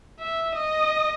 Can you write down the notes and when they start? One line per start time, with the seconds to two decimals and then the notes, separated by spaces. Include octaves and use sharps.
0.20 E5
0.55 D#5